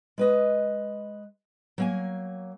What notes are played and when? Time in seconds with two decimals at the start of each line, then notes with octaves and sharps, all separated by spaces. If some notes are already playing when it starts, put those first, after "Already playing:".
0.18 G#3 B4 D#5
1.78 F#3 A#3 G#5